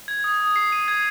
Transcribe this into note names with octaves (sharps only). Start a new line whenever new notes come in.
G#6
D#6
D#6
C7
D#7
G#6